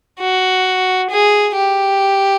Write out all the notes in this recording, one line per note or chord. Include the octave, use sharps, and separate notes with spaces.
F#4
G#4
G4